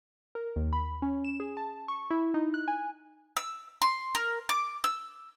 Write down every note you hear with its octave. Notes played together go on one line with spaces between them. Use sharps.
A#4
D#2
B5
C#4
E7
G#4
A5
C#6
E4
D#4
F#6
G#5
E6
C6
A#4
D6
E6